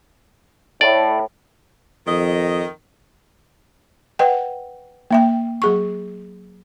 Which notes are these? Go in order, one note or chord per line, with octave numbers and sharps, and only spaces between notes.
A2 D5
F2 D#3 D#5
B4 D#5 F#5 G5
A#3 E5 G5
F#3 G#4 C#6